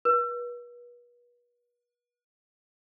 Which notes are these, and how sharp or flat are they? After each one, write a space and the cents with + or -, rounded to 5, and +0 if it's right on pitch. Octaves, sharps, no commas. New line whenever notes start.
B4 -35